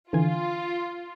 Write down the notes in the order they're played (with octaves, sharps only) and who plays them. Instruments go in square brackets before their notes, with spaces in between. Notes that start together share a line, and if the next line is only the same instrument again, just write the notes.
[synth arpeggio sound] D3 E3 G#5 [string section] F4